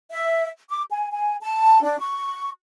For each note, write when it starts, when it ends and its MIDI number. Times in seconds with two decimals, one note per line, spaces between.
0.10 0.47 76
0.69 0.82 86
0.91 1.07 80
1.12 1.36 80
1.42 1.81 81
1.81 1.99 62
2.00 2.49 85